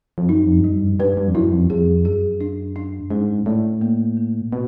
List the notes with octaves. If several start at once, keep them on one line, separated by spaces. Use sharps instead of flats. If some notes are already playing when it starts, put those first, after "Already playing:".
F2
F#2 D#4
F2
G2
F#2 G3
G2
G2 B4
G2
F2
F#2 E4
F2
F2 G#4
F#2 G#4
D4
D4
G#2 C#4
A2 D5
A#3
A#3
B2